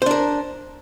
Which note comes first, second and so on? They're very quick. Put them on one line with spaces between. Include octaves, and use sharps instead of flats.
C5 D4 A#4